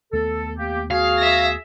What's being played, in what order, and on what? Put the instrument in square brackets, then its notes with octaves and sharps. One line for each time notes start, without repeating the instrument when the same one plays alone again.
[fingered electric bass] D#2 A3 B3 [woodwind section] A4
[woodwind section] A#3 G4
[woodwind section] F#4 G#4 [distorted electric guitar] F5
[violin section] E5 A#6